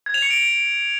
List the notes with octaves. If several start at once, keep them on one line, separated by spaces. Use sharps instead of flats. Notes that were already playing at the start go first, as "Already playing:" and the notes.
G#6
F7
C#7
D7